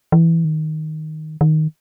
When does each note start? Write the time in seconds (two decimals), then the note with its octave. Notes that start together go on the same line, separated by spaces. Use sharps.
0.12 E3
0.45 D#3
1.41 D#3